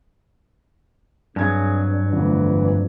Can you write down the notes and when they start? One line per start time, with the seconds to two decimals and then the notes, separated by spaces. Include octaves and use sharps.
1.36 G2 F#3 C4 G#4 G#5 G#6
2.12 G1 F2 E3 A3